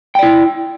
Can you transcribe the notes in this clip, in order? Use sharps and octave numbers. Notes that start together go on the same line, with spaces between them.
E4 D5 G5